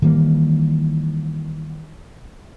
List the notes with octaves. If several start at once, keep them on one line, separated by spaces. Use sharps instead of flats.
D#3 E3 G3 A#3